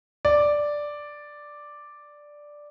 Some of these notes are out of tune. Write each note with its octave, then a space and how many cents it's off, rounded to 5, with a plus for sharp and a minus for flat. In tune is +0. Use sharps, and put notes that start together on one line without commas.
D5 +0